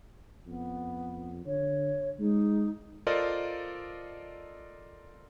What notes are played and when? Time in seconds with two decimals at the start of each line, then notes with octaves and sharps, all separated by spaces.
0.46 F2 B3
1.46 D3 C#5
2.19 G#3 D#4
3.07 F4 A4 A#4 C5 D5 D#5